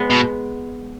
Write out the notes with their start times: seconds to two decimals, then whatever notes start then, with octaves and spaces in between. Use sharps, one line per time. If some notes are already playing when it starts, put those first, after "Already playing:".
Already playing: G#3 B3
0.10 B2